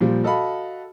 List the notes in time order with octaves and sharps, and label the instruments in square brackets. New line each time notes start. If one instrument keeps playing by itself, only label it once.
[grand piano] A#2 F3 G3
F#4 A4 D#5 F5 B5